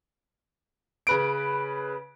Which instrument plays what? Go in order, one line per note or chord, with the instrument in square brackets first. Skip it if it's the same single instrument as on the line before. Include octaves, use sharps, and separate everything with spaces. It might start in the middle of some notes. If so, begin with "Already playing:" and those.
[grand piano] C#3 B4 D7